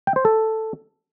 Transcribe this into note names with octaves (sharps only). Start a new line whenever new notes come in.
G5
C5
A4